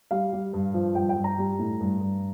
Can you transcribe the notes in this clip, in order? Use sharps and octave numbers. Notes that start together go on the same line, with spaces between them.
G3 F5
G3
G2
F3
G2 G5
G5
G2
A#5
G3
A2
G2
G2